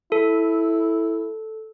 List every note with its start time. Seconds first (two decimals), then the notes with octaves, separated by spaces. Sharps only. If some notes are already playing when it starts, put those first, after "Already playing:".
0.12 E4 A4